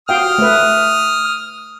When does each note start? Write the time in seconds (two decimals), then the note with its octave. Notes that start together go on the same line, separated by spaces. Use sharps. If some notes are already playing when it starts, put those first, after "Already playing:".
0.09 F#4 F5 G5 D#6 F6
0.38 A3 B4